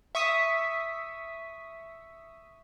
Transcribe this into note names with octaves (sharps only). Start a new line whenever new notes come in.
E5 C#6 D#6 B6